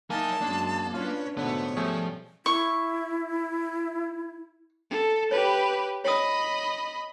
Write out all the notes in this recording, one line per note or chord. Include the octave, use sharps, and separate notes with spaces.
F#3 A#3 D#4 E4 G#5 A5
F#2 G#3 A#3 D4
C#4 D4 F4 B4 C#5
G#2 B2 D3 A3 B3 C#5
F3 G3 A3 C#4 G#4
E4 C#6
A4
G4 B4 C#5
C#5 D#5 B5 D#6